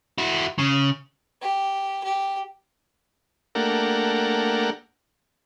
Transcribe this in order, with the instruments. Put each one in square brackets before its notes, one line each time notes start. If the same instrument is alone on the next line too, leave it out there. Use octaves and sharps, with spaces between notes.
[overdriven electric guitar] E4 F#4
C#3
[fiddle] G4
G4
[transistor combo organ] A3 A#3 D4 G4 A#4 F#5